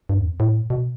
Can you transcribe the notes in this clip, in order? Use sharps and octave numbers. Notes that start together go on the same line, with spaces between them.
G2
E2
F2
A2
B2